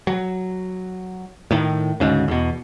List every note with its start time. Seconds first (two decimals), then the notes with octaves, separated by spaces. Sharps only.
0.07 F#3
1.51 A2 D#3
2.00 D2 G#2 C#3
2.28 E2 B2